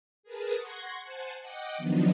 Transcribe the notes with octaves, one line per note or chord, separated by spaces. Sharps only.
G#4 A#4 B4 A5 D#6
F#5 C6 C#6 G#6 A#6
C5 F#5 G#5 A5
D#5 F#5 G5 D6
D#3 F3 F#3 B3 D4 D#4